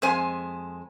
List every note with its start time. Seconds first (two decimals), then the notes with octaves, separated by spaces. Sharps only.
0.02 F2 G#3 C5 G#5